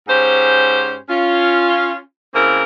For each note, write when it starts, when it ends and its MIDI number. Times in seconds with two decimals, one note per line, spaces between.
0.08 0.98 44
0.08 0.98 61
0.08 0.98 67
0.08 0.98 72
1.09 1.99 61
1.09 1.99 65
2.34 2.63 49
2.34 2.63 58
2.34 2.63 60
2.34 2.63 64
2.34 2.63 70